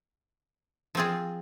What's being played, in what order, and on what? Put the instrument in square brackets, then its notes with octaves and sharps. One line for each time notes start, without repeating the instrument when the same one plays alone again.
[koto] F3 C4 F4 G#4